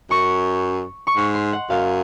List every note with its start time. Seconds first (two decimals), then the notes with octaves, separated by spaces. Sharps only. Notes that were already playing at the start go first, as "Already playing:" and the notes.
0.10 F#2 C#6
1.07 C#6
1.16 G#2 C6
1.35 C6
1.53 F#5
1.70 F#2 F5